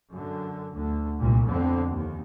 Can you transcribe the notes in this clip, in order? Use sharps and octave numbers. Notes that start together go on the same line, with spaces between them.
F#2 D3
D2 D3
C2 A#2 G3
F2 D3 B3 C4
D#2